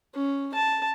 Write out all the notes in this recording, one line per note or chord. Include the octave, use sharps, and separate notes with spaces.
C#4
A5